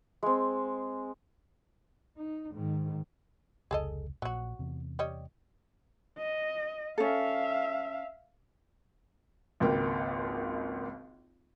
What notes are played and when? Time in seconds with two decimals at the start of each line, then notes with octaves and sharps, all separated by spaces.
0.23 G#3 C4
2.17 D#4
2.53 G#2 D#3
3.71 F1 C#2 G#4 A4 D#5
4.22 A#1 A#2 F#3 F#4
4.59 E2 C3
4.99 G3 C#5 D#5
6.18 D#5
6.98 C#4 A4 E5 F5
9.60 G#1 C#2 A#3 G5